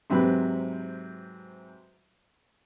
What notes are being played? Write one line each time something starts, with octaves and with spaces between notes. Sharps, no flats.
G#2 C3 F#3 B4 B5